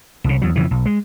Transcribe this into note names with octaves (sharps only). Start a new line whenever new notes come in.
C2 C#3
E2 F#3
F2 C#3 E3
B1
G#3